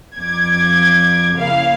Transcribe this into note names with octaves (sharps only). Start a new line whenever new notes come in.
F2 D6 G#6
C#3 A#3 E4 F5